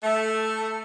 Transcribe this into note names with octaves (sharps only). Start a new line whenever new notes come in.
A3